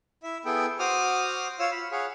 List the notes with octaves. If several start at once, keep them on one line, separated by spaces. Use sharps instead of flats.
E4 E5
B3 E4 G#4 A4 G5
F#4 C5 D6 D#6 F6
F4 C#5 F5 E6
B5
G#4 C#5 F5 F#5